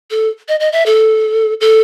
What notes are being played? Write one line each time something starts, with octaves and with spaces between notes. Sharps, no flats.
A4
D#5
D#5
E5
A4
A4